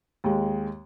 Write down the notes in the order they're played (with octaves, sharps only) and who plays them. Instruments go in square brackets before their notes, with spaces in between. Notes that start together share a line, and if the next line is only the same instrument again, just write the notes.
[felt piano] D#2 G#3